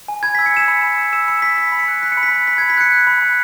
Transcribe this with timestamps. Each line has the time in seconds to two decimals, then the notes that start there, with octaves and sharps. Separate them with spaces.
0.08 G#5
0.23 B5 G#6
0.35 B6
0.39 E6
0.46 C#7
0.53 G#5 E7
0.68 B5 C#7
0.83 B5
0.98 E6
1.13 E6 E7
1.28 B5 C#7
1.42 B5 B6
1.58 B5 B6
1.72 B5
1.80 C#7
1.88 F#6
2.02 F#6 B6
2.12 C#7
2.17 B5
2.23 B6
2.32 B5
2.47 B5 B6
2.58 G#6
2.62 B5
2.70 B6
2.77 F#6 C#7
2.92 F#6
3.07 B5
3.22 B5